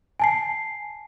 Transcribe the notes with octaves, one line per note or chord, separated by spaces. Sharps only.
G#5 A5 C7